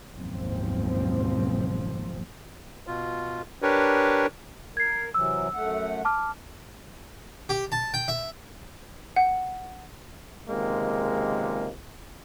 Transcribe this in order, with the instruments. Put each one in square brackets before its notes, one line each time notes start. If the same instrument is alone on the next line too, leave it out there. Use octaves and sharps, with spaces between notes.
[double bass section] F#1 D#2 G#2 B2 F3 C4
[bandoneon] B2 F4
D4 G4 A#4 B4 C#5
[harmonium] A#4 [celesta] G#6 C7
[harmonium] C3 E3 F#3 [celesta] E6
[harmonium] F#2 A3 F#5
[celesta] A5 D6 F6
[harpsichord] G4
A5
G5
E5
[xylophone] F#5
[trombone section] C#2 C3 D#3 G#3 A#3